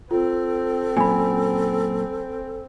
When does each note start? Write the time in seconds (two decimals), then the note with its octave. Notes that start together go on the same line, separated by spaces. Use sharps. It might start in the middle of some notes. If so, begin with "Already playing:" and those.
0.11 C4 F4 A4
0.97 F#2 A#2 G#5 B5